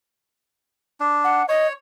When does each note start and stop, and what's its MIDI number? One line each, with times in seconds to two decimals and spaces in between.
1.00 1.43 62
1.24 1.46 78
1.49 1.73 73
1.49 1.67 75